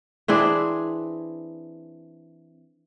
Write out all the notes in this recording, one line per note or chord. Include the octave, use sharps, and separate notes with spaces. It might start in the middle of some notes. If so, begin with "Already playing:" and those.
E3 C4 D4 G#4